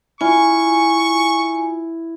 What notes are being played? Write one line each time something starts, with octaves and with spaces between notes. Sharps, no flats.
E4 F4 G#5 C#6